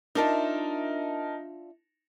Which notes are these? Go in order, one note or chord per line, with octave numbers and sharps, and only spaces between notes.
D4 D#4 F4 A#4 E5 A5